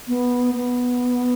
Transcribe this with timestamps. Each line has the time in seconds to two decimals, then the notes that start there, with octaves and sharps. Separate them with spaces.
0.08 B3
0.55 B3